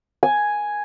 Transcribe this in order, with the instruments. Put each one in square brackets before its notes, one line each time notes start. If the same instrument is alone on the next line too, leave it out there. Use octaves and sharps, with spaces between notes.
[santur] G#5